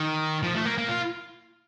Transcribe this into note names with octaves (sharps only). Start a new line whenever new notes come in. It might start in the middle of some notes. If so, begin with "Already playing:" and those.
Already playing: D#3
F3
A3
A#3
A#3
F4